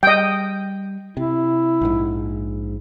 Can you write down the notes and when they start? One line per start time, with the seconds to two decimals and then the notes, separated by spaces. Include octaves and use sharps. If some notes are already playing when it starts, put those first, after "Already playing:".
0.03 G3 D#5 G5
1.17 C3 E4
1.81 A#1 G#2